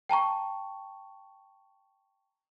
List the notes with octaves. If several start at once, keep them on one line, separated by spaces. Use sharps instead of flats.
G5 A5 A#5 C#6